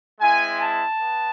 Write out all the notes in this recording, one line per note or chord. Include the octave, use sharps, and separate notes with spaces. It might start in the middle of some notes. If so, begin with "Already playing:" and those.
G#3 C4 E4 G#5
A5
B3